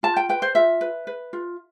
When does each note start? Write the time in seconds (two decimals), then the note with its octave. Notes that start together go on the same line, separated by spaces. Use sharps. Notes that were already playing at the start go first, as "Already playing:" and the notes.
0.03 F4 A5
0.16 G5
0.29 B4 G5
0.42 C5
0.55 F4 E5
0.81 B4
1.07 B4
1.33 F4